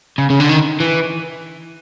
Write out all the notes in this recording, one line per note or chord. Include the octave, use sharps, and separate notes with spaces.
C#3
C#3
D3
D#3
E3